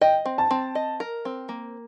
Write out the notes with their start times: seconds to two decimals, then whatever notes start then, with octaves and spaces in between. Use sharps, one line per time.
0.01 D#5 G5
0.26 C4
0.38 A5
0.51 C4
0.75 D#5
1.00 A#4
1.25 C4
1.49 A#3